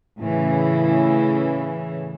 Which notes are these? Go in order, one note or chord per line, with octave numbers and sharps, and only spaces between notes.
A2 C#3 E3